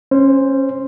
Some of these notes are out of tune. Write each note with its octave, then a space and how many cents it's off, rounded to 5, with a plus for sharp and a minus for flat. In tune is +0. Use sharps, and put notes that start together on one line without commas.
C#4 -25 C5 +0